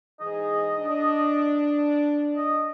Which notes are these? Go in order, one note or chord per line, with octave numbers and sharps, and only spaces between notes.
G#2 E3 G#4 D#5
D4
D#5